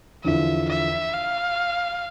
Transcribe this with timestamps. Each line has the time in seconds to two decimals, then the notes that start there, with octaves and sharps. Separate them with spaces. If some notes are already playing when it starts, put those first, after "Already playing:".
0.24 E2 D3 F3 E5
0.69 E5
1.13 F5